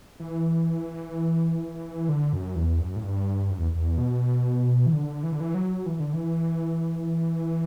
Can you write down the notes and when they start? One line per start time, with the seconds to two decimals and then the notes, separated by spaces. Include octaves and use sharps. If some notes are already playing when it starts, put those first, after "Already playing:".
0.20 E3
2.09 D3
2.33 F#2
2.55 E2
2.80 F#2
2.96 A2
3.03 G2
3.50 F#2
3.59 E2
3.75 E2
3.98 B2
4.86 E3
4.92 D3
5.23 E3
5.32 D3
5.40 E3
5.54 F#3
5.86 E3
6.00 D3
6.13 E3